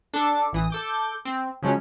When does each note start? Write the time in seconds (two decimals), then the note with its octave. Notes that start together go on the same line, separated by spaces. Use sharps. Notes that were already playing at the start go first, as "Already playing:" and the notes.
0.14 D4 A4 D6
0.53 A1 E3 D#6
0.70 A4 D6 G6
1.25 C4
1.62 C#3 F3 F#3 G#3 C#4